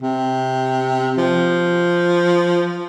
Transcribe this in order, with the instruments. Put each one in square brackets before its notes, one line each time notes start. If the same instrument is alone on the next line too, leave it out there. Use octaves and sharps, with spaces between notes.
[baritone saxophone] C3
F3